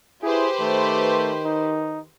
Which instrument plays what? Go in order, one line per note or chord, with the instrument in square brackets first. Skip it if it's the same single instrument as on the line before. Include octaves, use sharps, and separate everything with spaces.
[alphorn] E4 [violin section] G4 B4 C5 [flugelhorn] G#4
[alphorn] D#3 [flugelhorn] A3
[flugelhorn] D#4